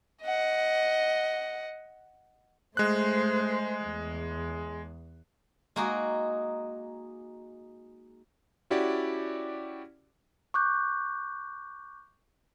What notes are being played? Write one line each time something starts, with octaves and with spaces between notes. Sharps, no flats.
D#5 F#5
G#3 A3 C5 F#6
E2
G#3 A#3 D#4 F#4 G#4
C#4 E4 F#4 G4 D5
C#6 D6 F#6 G6